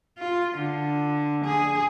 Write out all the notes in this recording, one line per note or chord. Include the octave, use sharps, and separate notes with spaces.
F4
D3
G#4